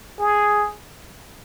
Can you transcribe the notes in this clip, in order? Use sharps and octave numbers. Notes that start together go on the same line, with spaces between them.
G#4